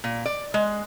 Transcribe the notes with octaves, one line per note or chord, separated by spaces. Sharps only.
A#2
D5
G#3